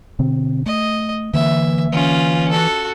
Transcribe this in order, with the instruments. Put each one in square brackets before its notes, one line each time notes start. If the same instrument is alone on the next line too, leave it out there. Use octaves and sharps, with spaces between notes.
[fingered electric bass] B2 D3 C4
[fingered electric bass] A3 [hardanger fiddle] D#5
[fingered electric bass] D3 A#3 [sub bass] E3 [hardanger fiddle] E5
[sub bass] E3 [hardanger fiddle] C#4 F4
[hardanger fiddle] F#4 A4